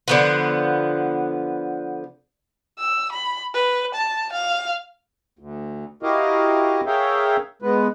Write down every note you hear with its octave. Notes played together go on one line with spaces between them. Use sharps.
D3 F3 B3
E6
B5
B4
A5
F5
D2
E4 F#4 G4 A#4 D#5 F5
G#4 A#4 C#5 E5 F5 G5
G#3 B3 B4